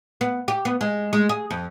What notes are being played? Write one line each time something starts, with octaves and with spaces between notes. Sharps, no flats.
B3
G4
B3
G#3
G#3
G#4
F2